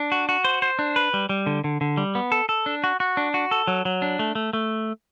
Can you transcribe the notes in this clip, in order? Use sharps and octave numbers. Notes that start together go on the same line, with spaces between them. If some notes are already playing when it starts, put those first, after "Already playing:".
Already playing: D4
F#4
F#4
C5
C5
D4
B4
G3
G3
D3
D3
D3
G3
B3
A4
A4
D4
F#4
F#4
D4
F#4
A4
F#3
F#3
D4
A3
A3
A3